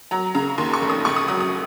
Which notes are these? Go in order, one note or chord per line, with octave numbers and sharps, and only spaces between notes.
F#3 A#5
C#3 A#5
D#2 C6
C#6
F1
D#6
C#2 C#6
D#6
F#3 D#6
D#6